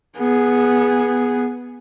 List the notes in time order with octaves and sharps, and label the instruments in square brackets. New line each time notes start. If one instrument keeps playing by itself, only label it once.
[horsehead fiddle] B3 G#4